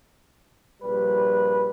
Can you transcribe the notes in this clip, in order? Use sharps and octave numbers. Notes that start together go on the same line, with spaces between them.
A#1 G3 B4